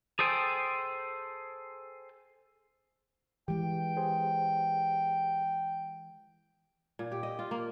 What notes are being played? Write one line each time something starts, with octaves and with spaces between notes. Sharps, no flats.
G#4 A4 C5 G5 G#5
E3 G#3 G4 G5
G4 G#4 C5
A#2
G4
D#5
F4
A#3